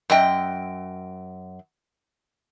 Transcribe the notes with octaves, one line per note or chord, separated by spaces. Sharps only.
F#2 D#5 G5